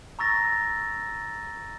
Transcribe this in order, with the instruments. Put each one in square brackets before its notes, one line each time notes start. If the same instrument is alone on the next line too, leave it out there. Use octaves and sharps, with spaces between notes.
[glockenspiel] A#5 C#6 E6 A6 A#6